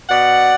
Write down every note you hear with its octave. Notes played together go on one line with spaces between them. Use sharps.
B2 D5 F#5